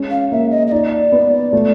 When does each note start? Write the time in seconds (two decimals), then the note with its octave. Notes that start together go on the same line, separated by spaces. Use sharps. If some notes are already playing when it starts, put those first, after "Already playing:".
Already playing: G#3 C#4
0.11 F5
0.32 A#3 E5
0.51 D#5
0.67 D#5
0.72 D#4 D5
1.12 B3
1.53 A3